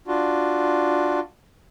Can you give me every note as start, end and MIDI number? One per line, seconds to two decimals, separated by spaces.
0.07 1.20 62
0.07 1.20 65
0.07 1.20 66